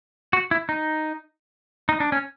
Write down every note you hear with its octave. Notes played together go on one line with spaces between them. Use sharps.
F#4
E4
D#4
D#4
D4
C#4